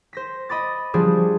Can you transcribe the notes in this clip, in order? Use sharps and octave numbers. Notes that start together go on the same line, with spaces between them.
C5 A#6 B6
D#5 B5 D6 A6
F3 G3 D4 G#4